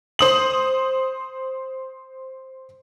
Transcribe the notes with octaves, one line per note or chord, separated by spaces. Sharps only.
C5 D#6 F#7